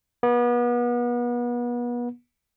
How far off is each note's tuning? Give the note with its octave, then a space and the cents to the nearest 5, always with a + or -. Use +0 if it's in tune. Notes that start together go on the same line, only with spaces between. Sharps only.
B3 -35